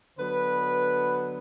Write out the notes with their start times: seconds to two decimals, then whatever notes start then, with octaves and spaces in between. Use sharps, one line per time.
0.18 D3 F#3 B3 B4